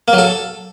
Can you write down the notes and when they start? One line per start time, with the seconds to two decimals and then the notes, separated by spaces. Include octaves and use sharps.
0.08 A#3
0.13 F#3
0.18 A4